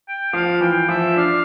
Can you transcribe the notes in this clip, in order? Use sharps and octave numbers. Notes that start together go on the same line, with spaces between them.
G5
F3 F5
E3 G5
F3 E5
D4 F5